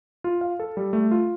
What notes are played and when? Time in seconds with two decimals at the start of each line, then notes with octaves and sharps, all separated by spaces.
0.24 F4
0.41 F5
0.60 A4
0.77 G3
0.93 A3
1.11 F4